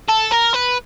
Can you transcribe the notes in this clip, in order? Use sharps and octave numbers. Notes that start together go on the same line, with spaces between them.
A4
A#4
B4